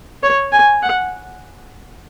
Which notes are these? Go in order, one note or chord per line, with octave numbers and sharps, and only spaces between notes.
C#5
G#5
F#5